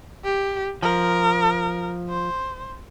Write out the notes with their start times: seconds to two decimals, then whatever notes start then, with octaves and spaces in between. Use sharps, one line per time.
0.25 G4
0.82 F3 A#4
2.09 C5